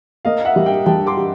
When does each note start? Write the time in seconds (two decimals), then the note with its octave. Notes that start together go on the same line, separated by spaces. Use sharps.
0.25 A#3 D#5 F5
0.45 E5 F#5
0.56 G3
0.66 F5 G5
0.86 G3 G5 A5
1.07 C6 D6
1.17 G4